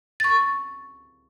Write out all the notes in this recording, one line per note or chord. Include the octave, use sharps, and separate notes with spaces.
C#6 A6